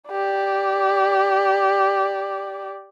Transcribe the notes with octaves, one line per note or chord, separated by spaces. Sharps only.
G4 D5